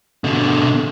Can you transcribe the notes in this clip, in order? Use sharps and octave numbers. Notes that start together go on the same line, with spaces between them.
B2 D3